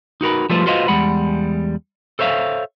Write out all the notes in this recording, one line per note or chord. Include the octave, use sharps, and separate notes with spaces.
D#4 F#4 A#4 B4
F3 G3 A3 F4 B4 C5
F4 F#4 B4 C5 D#5 F5
E2 G3 G#3 F#5 B5
A4 C5 C#5 E5 F5